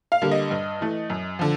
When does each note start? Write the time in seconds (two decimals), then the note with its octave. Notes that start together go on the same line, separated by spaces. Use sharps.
0.12 F5
0.22 D3 G3 A#3
0.31 D#5
0.51 G2
0.81 E3 A3
1.10 F#2
1.39 D3 F3